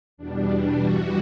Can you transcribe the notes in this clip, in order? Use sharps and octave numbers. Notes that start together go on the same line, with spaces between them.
E2 B2 G3 D4
D4
G2 E3 G3 F#4